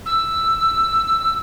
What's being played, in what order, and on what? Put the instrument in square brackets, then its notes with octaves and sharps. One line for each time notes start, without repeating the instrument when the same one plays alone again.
[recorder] E6